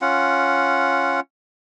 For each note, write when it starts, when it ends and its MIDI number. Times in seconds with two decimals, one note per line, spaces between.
0.01 1.20 61
0.01 1.20 65
0.01 1.20 78